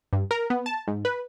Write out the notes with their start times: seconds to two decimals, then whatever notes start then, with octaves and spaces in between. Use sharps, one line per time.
0.13 G2
0.31 A#4
0.50 B3
0.66 A5
0.88 G#2
1.05 B4